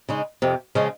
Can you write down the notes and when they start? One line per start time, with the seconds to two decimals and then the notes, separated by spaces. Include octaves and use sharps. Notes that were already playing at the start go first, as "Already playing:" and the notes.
0.09 C#3 G#3 D#4
0.42 F2 C3 F3
0.75 C#3 F3 G#3 C#4